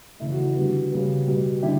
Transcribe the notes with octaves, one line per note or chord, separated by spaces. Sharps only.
C#3 E3 A3 E4
F#4
E4
D3 G3 B3 F#4
C#3 G3 B3
B2 G3 B3
D3 G3 B3 E4 G4